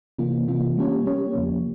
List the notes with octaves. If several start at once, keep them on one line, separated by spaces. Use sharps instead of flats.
C3 E3 A#3 F4
C3 E3 A#3 F4
G3 A#3 C#4 G4 C#5
G3 A#3 C#4 G4 C#5
E2 C#3 F3 A#3